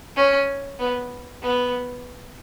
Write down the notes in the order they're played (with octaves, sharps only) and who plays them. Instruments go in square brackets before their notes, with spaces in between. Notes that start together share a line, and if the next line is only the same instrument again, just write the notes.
[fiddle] C#4
B3
B3